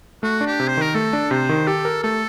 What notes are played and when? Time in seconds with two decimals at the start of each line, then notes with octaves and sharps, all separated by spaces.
0.23 A3 F#4
0.41 D4
0.47 G4
0.60 C3
0.68 C5
0.77 D#3 A#4
0.95 A3 A4
1.13 D4
1.31 C3 C5
1.49 D#3
1.67 G4 A4
1.85 A#4
2.03 A3 A4